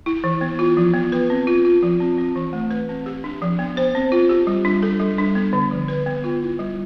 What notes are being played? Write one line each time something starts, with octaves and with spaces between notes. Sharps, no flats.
E4
E3
B3
F4
F3
B3
B4
C4
F4
F4
F3
C4
C4
E3
A3
B4
C4
G4
D4
F3
B3
C5
C4
F4
G4
G3
D4
A4
G3
D4
B3
D3
F3
B4
B3
F4
E4
G3